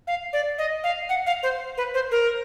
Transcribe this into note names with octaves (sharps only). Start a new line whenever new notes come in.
F5
D5
D#5
F5
F#5
F5
C5
B4
C5
A#4